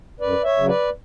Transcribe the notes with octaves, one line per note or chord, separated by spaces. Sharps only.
F#2 B4 D5
C#5 E5
C#3 F#3
B4 D5